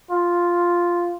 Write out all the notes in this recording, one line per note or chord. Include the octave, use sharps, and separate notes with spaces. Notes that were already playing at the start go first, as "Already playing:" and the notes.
F4